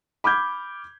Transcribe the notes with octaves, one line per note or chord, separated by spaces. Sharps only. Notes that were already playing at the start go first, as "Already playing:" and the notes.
B5 D6 F6 G6 G#6